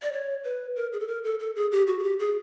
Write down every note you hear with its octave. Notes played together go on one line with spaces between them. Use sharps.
D5
C#5
B4
A#4
G#4
A4
A#4
A4
A4
G#4
G4
F#4
G#4
G4
G#4